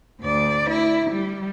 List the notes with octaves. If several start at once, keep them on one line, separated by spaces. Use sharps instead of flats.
D2 D5
E4
G3